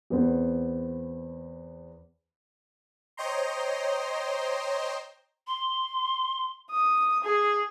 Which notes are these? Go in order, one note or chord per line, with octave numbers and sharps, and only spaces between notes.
E2 B3 C4
C5 C#5 D#5 G5 A#5 C6
C6
D#6
G#4